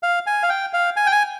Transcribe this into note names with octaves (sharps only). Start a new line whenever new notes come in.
F5
G#5
F5
G5
F5
G#5
G5
G#5